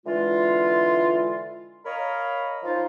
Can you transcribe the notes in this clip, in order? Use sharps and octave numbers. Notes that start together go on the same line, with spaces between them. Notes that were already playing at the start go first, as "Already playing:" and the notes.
D3 E3 G#3 F4
A#4 C#5 D#5 F5 A#5 B5
F3 D#4 F4